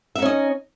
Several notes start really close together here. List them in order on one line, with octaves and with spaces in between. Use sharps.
E5 D#4 C#4 D#5